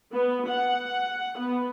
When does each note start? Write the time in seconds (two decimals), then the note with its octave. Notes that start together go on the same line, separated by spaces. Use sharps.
0.12 B3
0.47 F#5
1.38 B3